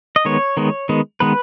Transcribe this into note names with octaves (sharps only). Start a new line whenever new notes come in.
D#5
D#3 G#3 B3 C#5
D#3 G#3 B3
D#3 G#3 B3
D#3 G#3 B3 B4